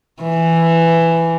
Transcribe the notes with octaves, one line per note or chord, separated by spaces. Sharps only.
E3